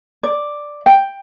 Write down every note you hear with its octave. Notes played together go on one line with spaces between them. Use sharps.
D5
G5